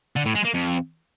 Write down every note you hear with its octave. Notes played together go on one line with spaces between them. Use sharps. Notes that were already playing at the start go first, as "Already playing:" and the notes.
D3
A2
G#3
A#3
F2